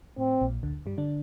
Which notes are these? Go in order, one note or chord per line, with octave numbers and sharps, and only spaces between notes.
A2 C4
A#1 A#2
D2 D3
G2 G3
D3 D4